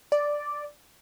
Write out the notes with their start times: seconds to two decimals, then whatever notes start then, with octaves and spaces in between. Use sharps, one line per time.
0.12 D5